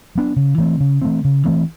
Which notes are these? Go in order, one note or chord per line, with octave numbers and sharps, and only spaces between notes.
F#3 B3 D4
C#3
E3 A3 C4
C#3
E3 A3 C4
C#3
E3 A3 C4